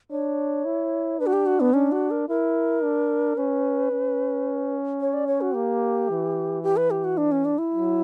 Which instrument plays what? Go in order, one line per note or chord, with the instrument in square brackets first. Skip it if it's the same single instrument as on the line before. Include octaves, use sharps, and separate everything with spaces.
[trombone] D4 [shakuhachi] C#5
[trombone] E4
[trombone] D4 [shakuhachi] B4
[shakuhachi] F#4
G4
F#4
B3
[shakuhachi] C#4 [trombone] D4
[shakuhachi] F#4
A#4
[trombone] E4 [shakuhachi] A#4
[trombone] D4
[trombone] C#4 [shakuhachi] B4
[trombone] C#4
[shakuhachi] C#5
D5
C#5
F#4
[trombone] A#3 [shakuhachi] G4
[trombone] E3
[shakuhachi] G4
B4
G4
F#4
D4
C#4
D4
E4
[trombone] F#3